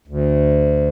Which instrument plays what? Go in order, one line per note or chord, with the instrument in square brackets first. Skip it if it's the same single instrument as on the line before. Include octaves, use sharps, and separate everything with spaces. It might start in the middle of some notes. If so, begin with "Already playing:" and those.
[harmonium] D2